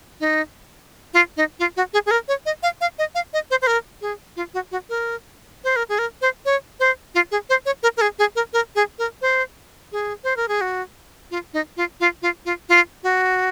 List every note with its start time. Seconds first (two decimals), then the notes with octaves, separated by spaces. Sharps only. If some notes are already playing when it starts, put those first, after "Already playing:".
0.20 D#4
1.14 F4
1.37 D#4
1.59 F4
1.77 F#4
1.93 G#4
2.06 G#4
2.11 A#4
2.28 C#5
2.46 D#5
2.63 F5
2.81 F5
2.99 D#5
3.15 F5
3.33 D#5
3.51 C5
3.62 C5
3.67 A#4
4.01 G#4
4.36 F4
4.54 F#4
4.71 F#4
4.89 A#4
5.64 C5
5.76 A#4
5.89 G#4
5.99 A#4
6.21 C5
6.45 C#5
6.80 C5
7.15 F4
7.31 G#4
7.49 C5
7.66 C#5
7.83 A#4
7.97 A#4
8.01 G#4
8.19 G#4
8.35 A#4
8.53 A#4
8.75 G#4
8.98 A#4
9.22 C5
9.92 G#4
10.24 C5
10.36 A#4
10.48 G#4
10.61 F#4
11.31 F4
11.53 D#4
11.77 F4
12.00 F4
12.22 F4
12.45 F4
12.69 F4
13.03 F#4